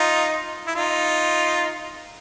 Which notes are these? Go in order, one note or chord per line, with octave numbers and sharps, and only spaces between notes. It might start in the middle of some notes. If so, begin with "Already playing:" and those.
Already playing: D#4 F4
E4
D#4 F4